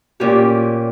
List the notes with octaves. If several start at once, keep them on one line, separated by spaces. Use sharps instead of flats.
A#2 C#4 G4